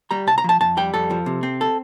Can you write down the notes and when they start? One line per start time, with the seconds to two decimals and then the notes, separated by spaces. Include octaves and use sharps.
0.11 G3 A#5
0.27 C2 A5
0.38 A#5
0.44 F3 A5
0.61 F2 A5
0.77 G3 G5
0.94 F2 A4
1.11 F3
1.26 C3
1.43 C4
1.61 A4